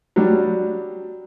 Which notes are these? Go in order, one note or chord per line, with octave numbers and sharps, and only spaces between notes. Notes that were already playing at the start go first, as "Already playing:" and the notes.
F#3 G3 D4